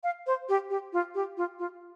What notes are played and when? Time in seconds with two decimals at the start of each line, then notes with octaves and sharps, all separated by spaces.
0.03 F5
0.27 C5
0.49 G4
0.70 G4
0.93 F4
1.14 G4
1.37 F4
1.59 F4